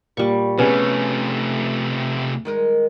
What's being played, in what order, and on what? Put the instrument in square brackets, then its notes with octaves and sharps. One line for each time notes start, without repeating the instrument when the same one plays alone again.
[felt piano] A#2 [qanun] G3 C#6
[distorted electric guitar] C3 A3 [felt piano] B3 G#4 G#5 [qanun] C#4
[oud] D#3 G#3 A#4